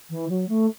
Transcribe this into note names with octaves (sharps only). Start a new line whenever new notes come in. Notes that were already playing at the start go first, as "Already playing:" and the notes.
E3
F#3
A3